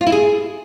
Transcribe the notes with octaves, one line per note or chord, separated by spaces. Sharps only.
F4
E4
G#4